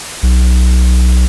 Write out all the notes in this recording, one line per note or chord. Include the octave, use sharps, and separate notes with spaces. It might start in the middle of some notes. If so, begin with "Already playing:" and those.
B1